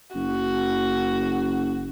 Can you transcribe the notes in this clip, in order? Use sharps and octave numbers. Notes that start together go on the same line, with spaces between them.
F#1 F#4